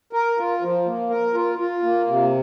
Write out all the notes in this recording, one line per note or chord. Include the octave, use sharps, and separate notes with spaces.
A#4
F4
F3
A#3
A#4
F4
F4
A#3
C3